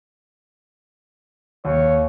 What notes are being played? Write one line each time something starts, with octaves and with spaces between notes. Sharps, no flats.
D#2 C#5